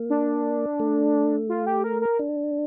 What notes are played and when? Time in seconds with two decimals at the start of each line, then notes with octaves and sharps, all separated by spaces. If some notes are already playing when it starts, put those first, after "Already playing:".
Already playing: A#3
0.10 D4
0.80 A3
1.49 F4
1.67 G4
1.84 A#4
2.02 A#4
2.19 D4